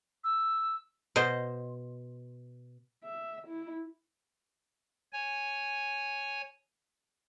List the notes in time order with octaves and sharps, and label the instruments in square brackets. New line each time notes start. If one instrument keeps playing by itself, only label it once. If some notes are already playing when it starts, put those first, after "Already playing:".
[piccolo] E6
[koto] B2 C5 D#5
[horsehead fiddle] E5
E4
[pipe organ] C#5 G#5